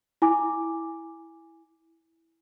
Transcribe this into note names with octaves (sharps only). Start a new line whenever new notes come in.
E4 G#5 D6